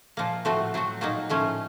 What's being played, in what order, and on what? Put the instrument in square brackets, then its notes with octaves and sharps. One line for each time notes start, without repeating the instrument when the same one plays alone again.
[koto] A#2 F3 A#3
A2 F3 A3 C4 F#4
F#3 C4 F#4
A#2 F#3 A#3 D#4
A2 F3 A3 C#4